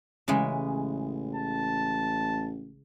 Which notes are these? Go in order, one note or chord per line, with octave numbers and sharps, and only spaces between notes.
A1 C#3 E3 G#3
A5